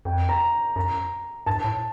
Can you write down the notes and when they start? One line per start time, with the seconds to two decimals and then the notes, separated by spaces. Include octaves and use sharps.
0.05 F2 G5
0.29 A#5
0.76 F#2 A#5
1.46 G2 A5
1.64 A2